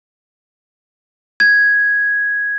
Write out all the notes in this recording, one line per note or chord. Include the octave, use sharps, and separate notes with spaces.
G#6